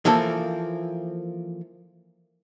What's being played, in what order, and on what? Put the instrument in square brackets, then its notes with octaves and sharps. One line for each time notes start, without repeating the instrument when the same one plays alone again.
[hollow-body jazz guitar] E3 F3 A#3 A4